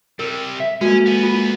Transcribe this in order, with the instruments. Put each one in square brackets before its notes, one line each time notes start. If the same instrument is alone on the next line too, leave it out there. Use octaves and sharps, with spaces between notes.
[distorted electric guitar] C3 G3 [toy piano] A#4
[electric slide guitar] E5
[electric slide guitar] G#3 A#3 [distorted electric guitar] C#4 [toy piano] F#4 B4
[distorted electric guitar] B3 G#4
[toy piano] F4